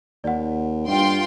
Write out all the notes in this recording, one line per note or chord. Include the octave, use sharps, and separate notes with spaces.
D#2 D5 F#5
G2 F4 G5 C6